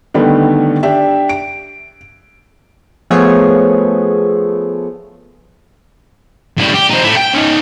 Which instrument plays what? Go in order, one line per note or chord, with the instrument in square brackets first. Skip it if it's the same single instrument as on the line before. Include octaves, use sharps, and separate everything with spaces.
[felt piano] D3 D#3 G3 A3 B3
D4 G4 E5
D7
[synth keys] F3 A3 B3 G#4 C#5
[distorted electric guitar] A2 G3
G4
C4 D#4
A3 E4
G5
C#4 D#4